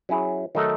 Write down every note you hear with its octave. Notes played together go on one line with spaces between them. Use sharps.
F#3 C#4 E4 G#4
D#3 F#3 A3 D#4 A4